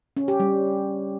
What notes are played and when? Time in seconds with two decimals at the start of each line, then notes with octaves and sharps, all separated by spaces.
0.17 C#4
0.28 G4
0.40 G3